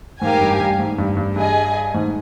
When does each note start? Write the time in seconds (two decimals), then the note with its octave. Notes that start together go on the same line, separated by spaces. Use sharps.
0.21 G#2 G4 A#4 F5 G#5
0.41 G2
0.60 G2
0.79 G#2
0.98 G2
1.17 G2
1.36 G2 G#4 D#5 G#5
1.94 G#2